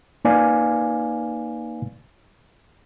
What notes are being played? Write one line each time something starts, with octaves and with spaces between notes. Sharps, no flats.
A#3 D#4 B4 D5 F5 G#5